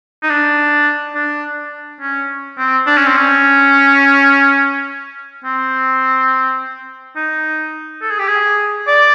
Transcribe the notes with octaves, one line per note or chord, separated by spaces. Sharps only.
D#4
D4
D4
C#4
C4
D4
C#4
C4
C#4
C4
D#4
A4
G#4
G4
G#4
D5